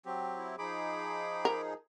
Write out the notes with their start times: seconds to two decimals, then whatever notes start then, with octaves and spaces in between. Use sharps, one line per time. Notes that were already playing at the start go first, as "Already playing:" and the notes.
0.05 F#3 C4 G4
0.38 E4
0.58 F3 D#4 G#4 B5 D6
1.45 A#4